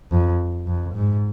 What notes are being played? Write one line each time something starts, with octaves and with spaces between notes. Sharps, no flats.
F2
F2
G#2